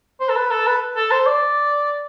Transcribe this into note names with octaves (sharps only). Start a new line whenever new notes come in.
C5
A4
B4
A4
B4
A4
C5
D5